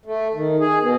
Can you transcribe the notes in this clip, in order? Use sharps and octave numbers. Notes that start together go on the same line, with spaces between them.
A3
D#3
G#4
B2